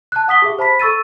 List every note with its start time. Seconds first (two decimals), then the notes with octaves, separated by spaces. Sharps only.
0.12 A5 F#6
0.28 F#5 D#6 B6 G7
0.42 G4 G#4 E5
0.58 C5 A5 B5 B6
0.80 A4 C#6 E6 A6 D#7